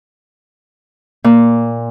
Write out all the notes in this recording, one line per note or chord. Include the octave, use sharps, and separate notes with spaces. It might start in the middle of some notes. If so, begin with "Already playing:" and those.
A#2